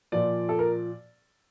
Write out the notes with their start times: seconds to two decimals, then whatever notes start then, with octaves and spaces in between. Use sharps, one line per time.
0.12 A#2 F3 D5
0.49 A4
0.59 A#4